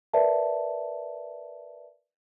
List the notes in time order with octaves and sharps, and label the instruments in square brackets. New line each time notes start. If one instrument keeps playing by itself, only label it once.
[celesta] A#4 B4 D5 E5 A5